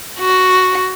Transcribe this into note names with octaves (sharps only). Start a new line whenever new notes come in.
F#4